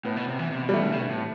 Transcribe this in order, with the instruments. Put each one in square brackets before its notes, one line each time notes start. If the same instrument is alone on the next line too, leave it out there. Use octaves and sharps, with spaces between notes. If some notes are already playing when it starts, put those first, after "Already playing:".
[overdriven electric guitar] A2 [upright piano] B3
[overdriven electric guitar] B2
C3
E3
C3
B2
[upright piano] G3
[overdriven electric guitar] E3 [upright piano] A3
[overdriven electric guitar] D3
C3
B2
A2